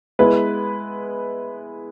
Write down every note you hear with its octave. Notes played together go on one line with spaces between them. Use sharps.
G#3 B3 E4 B4